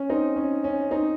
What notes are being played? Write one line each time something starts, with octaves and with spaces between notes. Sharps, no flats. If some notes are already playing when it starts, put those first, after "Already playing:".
Already playing: C#4
C4 D#4
C#4
C#4
C4 D#4